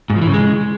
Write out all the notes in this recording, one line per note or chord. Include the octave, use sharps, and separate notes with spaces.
G#2
F3
E3
C#3
G#3